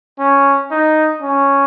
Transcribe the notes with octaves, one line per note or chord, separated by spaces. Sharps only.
C#4
D#4
C#4